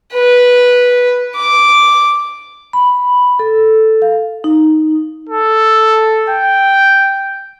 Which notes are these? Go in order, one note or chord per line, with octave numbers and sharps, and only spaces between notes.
B4
D6
B5
A4
F5
D#4
A4
G5